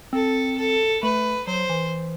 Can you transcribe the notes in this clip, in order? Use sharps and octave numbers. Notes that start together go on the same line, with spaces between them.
C4 A4
A4
A3 B4
F#3 C5
E3